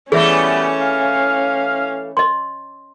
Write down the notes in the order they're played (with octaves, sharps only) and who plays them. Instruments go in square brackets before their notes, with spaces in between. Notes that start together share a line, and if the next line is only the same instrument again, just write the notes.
[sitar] E3 A3 [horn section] G3 B3 [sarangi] C#4 [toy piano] G#4 E5
[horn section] F5
[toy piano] D#5 C6